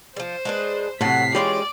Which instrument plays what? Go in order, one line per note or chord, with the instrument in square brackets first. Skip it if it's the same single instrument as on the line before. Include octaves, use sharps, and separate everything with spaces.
[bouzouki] F3 G3 [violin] C5
[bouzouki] G#3 D4 B4
[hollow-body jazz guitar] A2 C3 [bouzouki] F#3 A4 F#5 [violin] B6 C7
[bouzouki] E3 C#4 F4 [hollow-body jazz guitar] G#3 G4 [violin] D5